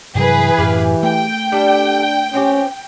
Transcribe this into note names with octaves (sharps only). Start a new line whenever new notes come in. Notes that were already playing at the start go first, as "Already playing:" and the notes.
G2 C3 E3 F#3 G#4 B4
F#2 A2 G4 F5
A3 G5
G3 D4 A4 D5
F3 C4 C#4 G4